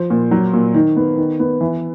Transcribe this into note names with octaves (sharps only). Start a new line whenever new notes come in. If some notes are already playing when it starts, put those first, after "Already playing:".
Already playing: F3 C5
A#2
F#3
A#2
D#3
B3
D#3
B3
E3